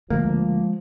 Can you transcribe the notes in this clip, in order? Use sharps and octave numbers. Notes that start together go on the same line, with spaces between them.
D2 F3 G#3 A#3